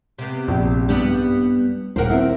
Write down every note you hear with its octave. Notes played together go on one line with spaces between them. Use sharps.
C3 B3
A#1
G2 G3 B3
D#1 A#4 C5 F#5
C4 E4